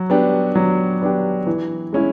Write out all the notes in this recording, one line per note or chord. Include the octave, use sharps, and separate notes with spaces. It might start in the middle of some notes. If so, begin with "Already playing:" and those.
Already playing: F#3
B3 D4 G4
F#3
B3 D4 G4
E3
G#3 C#4 E4